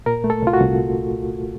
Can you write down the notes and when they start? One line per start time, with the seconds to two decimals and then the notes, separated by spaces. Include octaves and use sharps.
0.06 A#2 A#4
0.24 A3
0.30 A4
0.42 C2 F4
0.53 F#4
0.60 C2